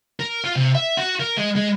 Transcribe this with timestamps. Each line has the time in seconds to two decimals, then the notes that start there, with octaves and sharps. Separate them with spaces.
0.20 A#4
0.44 F4
0.56 C3
0.75 E5
0.97 F#4
1.20 A#4
1.37 G#3
1.56 G#3